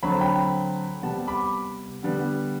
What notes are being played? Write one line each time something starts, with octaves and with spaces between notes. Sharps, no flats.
D3 F#3 A3 C4 B5
A5
G5 B5
C3 G3 B3 F#5 A5
B5 D6
D3 G3 B3